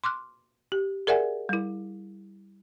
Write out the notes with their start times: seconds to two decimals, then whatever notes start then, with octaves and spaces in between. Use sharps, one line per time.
0.04 C6 D6 F6 F#6
0.72 G4
1.07 G#4 A#4 D5 E5 F#5 G#5
1.49 G3 E4